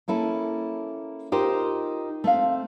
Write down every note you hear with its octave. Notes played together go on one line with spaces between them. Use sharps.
A#3 C#4 E4 A4
D#4 F4 G4 A#4 C5
A3 C4 F5